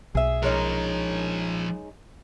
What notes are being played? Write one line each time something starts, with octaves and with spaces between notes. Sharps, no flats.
B1 G#4 E5
F3 G#3 C#4 D#4 A#4